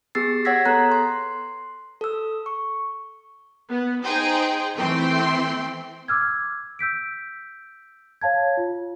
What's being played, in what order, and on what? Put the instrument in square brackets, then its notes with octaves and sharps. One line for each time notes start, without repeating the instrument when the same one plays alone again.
[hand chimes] B3 G4 G#4 E6 A6 C7
C#5 F#5 E6 G#6 A#6 B6
B3 A4 A#5 F#6
C6
A4 E6
C#6
[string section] B3
D#4 G#4 C5 G5
E3 A3 C4 G5 C6
[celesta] D6 E6 F6 G#6
E6 G6 B6 D7
C#5 F5 A5 G#6
F4